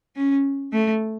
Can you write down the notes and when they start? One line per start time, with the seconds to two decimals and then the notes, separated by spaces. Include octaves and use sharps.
0.16 C#4
0.72 A3